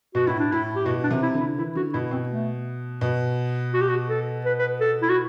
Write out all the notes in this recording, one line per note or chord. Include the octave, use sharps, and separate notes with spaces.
B2 F#4
A2 E4
D4
A2 E4
G4
B2 F#4
D4
C3
E4
D3
E4
E3 E4
D3 F#4
B2 E4
B2 C4
A3
B2
F#4
G4
F#4
A4
B4
B4
A4
E4
F#4